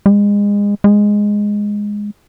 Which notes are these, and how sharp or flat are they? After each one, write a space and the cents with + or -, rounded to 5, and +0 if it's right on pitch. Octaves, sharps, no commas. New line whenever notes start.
G#3 -30
G#3 -5